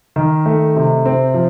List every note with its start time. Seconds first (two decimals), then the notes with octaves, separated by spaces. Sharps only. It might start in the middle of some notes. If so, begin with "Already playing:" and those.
0.16 D#3
0.46 A3
0.76 C3
1.06 C4
1.34 F3